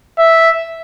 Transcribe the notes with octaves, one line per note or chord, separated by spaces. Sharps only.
E5